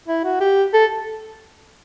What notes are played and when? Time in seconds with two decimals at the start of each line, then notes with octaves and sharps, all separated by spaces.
0.08 E4
0.24 F#4
0.41 G4
0.74 A4